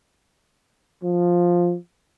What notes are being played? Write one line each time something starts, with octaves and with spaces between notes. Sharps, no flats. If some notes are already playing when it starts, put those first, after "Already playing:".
F3